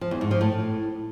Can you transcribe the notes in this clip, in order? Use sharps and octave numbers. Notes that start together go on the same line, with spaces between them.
F3
E2
G#2
F3
A2